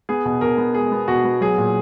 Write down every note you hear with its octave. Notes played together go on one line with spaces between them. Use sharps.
B3 G#4
B2
B2 A#4
B3
G#3 G#4
B3
B2 F#4
B3
F#3 G#4
A#2